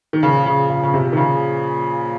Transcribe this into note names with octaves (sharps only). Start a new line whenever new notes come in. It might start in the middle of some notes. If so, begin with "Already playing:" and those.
D#3
A#2 C#3 F3 A#3 F4 G#4
C#3
C#3
C#3
C3
D#3
C#3